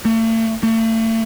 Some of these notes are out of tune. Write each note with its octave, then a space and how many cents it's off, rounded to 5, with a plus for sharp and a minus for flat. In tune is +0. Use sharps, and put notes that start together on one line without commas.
A3 +40
A3 +35